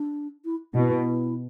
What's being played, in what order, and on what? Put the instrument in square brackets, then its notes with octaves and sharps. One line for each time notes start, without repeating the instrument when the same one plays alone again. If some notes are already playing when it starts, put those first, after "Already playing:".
Already playing: [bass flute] D4
E4
[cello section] B2 [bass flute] E4